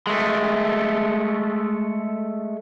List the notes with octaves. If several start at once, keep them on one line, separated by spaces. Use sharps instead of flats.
G#3 A3